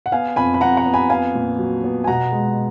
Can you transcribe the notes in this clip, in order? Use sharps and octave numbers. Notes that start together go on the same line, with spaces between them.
F#5
B3 F5 G#5
F2 G#5 B5
B5
F2 F#5 A#5
F#5 A#5
B3
G#5 B5
B3 F5 G#5
A#2
F#3
B3
G#5
B2 F#5 A#5
G#3